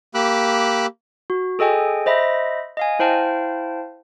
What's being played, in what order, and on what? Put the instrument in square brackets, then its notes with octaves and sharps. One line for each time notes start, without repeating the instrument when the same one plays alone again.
[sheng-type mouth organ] A#3 G4 B5 D6 E6 F#6
[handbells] F#4
G#4 A4 D#5 G5 G#5
C5 D#5 E5 B5 A#6
D#5 F5 G#5
E4 C5 F5 G5 A5